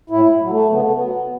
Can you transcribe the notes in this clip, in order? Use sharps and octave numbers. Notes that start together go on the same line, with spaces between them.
A2 E4
F#3
A3
C#3 B3
A3
B3
F#3